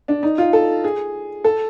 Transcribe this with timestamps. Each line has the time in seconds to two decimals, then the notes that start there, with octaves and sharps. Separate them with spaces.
0.08 D4
0.23 D#4
0.38 F4
0.53 A4
0.84 G#4
1.44 A4